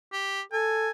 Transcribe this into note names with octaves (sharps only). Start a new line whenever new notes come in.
G4
A4 G#5